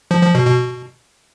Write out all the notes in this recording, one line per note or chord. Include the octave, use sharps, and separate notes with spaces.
F3
F3
B2
B2